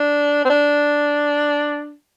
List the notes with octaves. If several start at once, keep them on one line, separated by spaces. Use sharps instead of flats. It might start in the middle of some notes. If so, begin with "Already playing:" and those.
Already playing: D4
C4
D4